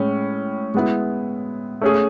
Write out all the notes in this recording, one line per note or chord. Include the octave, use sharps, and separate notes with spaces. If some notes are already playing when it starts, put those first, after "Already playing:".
Already playing: A2 G#3 C#4
G#3 B3 E4
A3 C#4 G#4